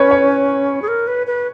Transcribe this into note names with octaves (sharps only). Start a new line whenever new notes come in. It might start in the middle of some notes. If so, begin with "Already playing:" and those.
Already playing: C#4 B4 C#5
C#5
G#4
A#4
B4
B4